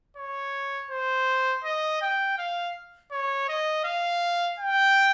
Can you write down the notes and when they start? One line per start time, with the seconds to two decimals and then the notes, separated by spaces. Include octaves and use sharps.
0.17 C#5
0.91 C5
1.64 D#5
2.02 G5
2.38 F5
3.11 C#5
3.48 D#5
3.84 F5
4.59 G5